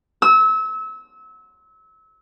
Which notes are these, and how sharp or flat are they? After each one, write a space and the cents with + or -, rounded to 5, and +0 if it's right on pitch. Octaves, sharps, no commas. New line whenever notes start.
E6 -30